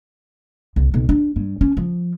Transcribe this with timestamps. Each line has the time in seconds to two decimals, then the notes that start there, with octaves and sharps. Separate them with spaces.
0.76 C2
0.94 B1
1.09 D4
1.36 G2
1.61 C#4
1.77 F3